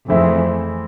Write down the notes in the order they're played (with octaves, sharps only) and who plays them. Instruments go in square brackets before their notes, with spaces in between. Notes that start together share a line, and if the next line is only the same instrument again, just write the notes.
[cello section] F2 [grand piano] E3 A3 C4 E4 G#4